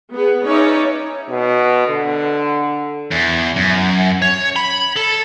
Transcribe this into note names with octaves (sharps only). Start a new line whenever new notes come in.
B3 G#4
C#4 D#4 B4 C#5 D5 E5
B2
D3
E2
F#2
C#5
B5
A4